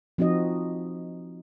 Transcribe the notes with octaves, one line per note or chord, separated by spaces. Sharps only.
F3 C4 D#4 F#4 D#5